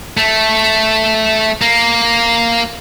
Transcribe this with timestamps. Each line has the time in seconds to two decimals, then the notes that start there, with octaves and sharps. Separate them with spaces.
0.17 A3
1.62 A#3